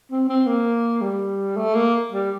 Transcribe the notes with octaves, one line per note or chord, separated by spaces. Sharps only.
C4
C4
A#3
G3
A3
A#3
G3